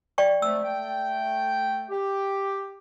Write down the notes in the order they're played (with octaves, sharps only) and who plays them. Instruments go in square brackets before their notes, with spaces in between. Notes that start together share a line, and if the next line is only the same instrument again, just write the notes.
[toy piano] D5 G5 C#6
[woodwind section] C3 F3 A3 [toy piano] E6
[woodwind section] A3 G5
G4